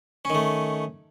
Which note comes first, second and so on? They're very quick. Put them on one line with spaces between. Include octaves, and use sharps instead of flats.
C#4 D#3 A3